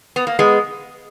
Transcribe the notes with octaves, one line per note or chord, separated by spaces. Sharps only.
B3
A#3
G#3 B3